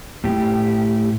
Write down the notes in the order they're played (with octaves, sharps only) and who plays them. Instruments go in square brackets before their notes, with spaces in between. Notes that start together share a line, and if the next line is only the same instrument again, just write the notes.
[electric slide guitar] A2 G4